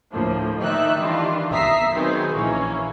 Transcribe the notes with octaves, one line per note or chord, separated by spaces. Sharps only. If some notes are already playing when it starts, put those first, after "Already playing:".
D2 A2 F3 A#3
D#3 D#4 D5 E5 F#6
D#3 E3 G3 D4 F4
E5 A#5 D#6 B6 C7
D#3 F#3 G#3 B3 C4 D#4
A#1 E3 A#3 C#4